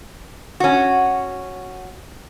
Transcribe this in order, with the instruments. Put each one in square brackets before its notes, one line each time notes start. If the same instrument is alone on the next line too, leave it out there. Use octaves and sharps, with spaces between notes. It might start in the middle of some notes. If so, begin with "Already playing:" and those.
[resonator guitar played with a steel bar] C#4 F#4